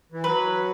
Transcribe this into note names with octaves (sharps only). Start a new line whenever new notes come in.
E3
F#3 B4